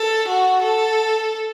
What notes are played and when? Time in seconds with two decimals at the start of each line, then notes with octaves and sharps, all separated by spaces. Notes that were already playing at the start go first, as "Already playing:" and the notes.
Already playing: A4
0.28 F#4
0.64 A4